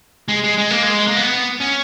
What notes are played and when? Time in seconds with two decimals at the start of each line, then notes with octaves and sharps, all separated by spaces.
0.28 G#3
0.44 G#3
0.58 G#3
0.70 A#3
0.83 G#3
1.07 A#3
1.16 B3
1.61 C#4